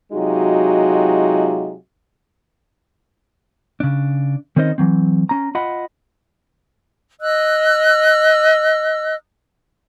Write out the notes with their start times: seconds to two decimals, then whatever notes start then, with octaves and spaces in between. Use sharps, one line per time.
0.13 C3 F#3 G#3 D#4 F4 F#4
3.80 C#3 D4
4.56 D#3 C4 C#4 D#4 C5 D#5
4.78 E3 F#3 C4
5.29 C#4 A#5
5.55 F4 D#5 F#5 B5
7.20 D#5 E6 F#6